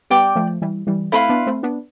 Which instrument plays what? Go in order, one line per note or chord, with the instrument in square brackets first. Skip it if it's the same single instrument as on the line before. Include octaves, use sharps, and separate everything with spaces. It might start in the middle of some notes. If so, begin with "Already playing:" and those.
[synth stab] G3 B3 [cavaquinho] D5 G5 D6
[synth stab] F3 A3
E3 G3
E3 G3
[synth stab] A3 C4 [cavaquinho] E4 B4 F5 C6
[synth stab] B3 D4
A3 C4
B3 D4